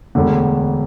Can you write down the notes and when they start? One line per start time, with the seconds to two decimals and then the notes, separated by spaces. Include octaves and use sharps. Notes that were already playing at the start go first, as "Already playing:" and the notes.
0.15 E1 D2 D3